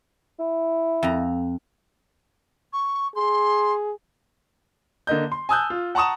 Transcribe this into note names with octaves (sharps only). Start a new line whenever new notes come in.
E4
F2 A#5
C#6
G#4 C6
D3 A#3 D#5 G6
C6
G#5 A5 D#6 E6 F#6 G6
F4
F#5 A5 A#5 C#6 D#6 E7